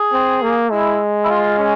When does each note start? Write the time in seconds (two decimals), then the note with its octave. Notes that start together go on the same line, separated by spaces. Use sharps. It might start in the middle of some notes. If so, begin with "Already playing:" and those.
Already playing: G#4
0.13 C4
0.42 A#3
0.71 G#3 E4
1.24 E4
1.30 F4
1.58 C#4